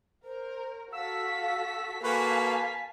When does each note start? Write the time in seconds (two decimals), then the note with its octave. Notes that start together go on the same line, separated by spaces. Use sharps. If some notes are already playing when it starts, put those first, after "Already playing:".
0.24 A#4 C5
0.92 F#4 A4 F5 E6 B6
2.03 A#3 F#4 A4 B4 F5 G#5 A5 B6